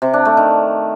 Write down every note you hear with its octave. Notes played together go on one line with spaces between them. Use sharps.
C3
D4
A3
D#3